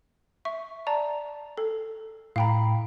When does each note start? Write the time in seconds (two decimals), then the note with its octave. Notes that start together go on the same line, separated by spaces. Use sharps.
0.45 E5 C#6
0.87 D5 A5 A#5
1.58 A4
2.36 A2 F5 G5 A#5 B5